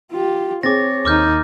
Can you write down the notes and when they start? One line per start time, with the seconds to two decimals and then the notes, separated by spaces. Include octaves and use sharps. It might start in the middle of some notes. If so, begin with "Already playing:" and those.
0.12 F4 G4
0.63 C4 G#4 C#5 D6 A6 A#6
1.05 D#2 D#4 D6 F6 G6